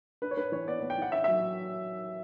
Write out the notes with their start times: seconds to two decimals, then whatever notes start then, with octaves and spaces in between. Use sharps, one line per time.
0.22 D4 B4
0.31 C#5
0.37 D4 B4
0.52 E3 C#5
0.67 B3 D5
0.82 B3
0.90 G5
0.98 E3 F#5
1.12 C#4 E5
1.24 F#3 E5